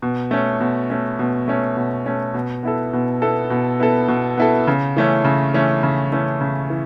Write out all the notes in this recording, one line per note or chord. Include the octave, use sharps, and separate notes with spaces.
B2
A3 C#4
B2
A3 C#4
B2
A3 C#4
B2
A3 C#4
B2
B3 E4 A4
B2
B3 E4 A4
B2
B3 E4 A4
B2
B3 E4 A4
C#3
E3 A3 C#4
C#3
E3 A3 C#4
C#3
E3 A3 C#4
C#3
E3